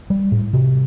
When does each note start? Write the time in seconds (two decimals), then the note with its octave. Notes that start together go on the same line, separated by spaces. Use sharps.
0.10 G3
0.32 A2
0.53 C3